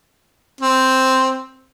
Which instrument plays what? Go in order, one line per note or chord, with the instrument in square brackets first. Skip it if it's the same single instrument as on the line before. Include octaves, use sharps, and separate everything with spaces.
[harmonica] C4